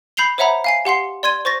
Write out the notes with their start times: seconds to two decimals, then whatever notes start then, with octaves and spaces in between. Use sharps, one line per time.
0.17 B5 G6 C7 F7 G7
0.38 C5 C#5 E5 F#5 A#5 B5
0.64 F5 G#5 C7
0.85 G4 F#5 C6 C7
1.23 D5 C6 G#6 D#7
1.45 C5 C#6 A6 A#6